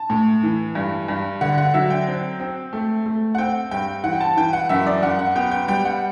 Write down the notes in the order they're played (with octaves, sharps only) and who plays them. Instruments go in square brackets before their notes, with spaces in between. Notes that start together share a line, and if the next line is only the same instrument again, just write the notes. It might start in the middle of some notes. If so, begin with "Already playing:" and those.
Already playing: [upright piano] A5
A2
E3
G2
G2
D3 F#5
F#5
F#3 E5
G5
C4
C4
A3
A3
F#5
C4 G5
G2 G5
E3 F#5
G5
A5
E3 G5
F#5
F#2 E5
D5
F#2 F#5
F#5
B3 G5
G5
G3 G5
F#5